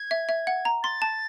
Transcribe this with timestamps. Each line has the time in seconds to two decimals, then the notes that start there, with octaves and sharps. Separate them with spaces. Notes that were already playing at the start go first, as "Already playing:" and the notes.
Already playing: G#6
0.11 E5
0.29 E5
0.47 F#5
0.65 A#5
0.83 C6 A6
1.02 A5